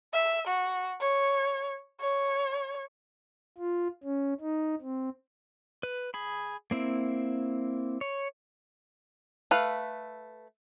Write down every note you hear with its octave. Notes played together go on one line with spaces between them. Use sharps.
E5
F#4
C#5
C#5
F4
C#4
D#4
C4
B4
G#4 B5
A#3 C4 E4
C#5
A3 B4 F5